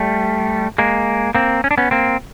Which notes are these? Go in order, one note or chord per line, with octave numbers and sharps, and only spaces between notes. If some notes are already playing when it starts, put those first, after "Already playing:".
Already playing: G3 A3
G#3 A#3
A#3 C4
C#4
D4
B3 C#4
A#3 C4